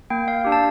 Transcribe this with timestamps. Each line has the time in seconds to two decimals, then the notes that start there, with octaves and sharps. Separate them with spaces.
0.10 A#3 G5
0.28 F5
0.45 D4 G4
0.52 A5